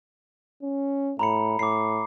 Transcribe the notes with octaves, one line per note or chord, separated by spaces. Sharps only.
C#4
A2 A#5 B5 C#7
A2 D6 C7